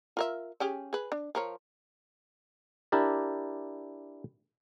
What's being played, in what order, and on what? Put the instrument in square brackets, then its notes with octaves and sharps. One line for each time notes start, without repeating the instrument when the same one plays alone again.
[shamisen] F4 A#4 E5
C#4 G4 G#4
G#4 B4
D4
F3 A#4 C#5
[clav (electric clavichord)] D4 E4 G4 A#4 D5